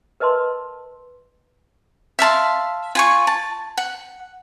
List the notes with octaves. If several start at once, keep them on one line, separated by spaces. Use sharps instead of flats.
A#4 B4 D#5 A5 C6
E5 F5 A5 C6
F4 G#5 C#6
A5
F#5